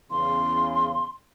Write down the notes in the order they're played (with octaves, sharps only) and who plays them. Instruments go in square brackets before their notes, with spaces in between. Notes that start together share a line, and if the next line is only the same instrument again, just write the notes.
[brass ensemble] E2 C#3 F5 [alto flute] C6